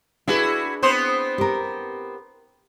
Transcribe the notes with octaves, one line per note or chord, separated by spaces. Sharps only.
D4 E4 F#4 G#4 B4
B3 C4 C5
G4 A#4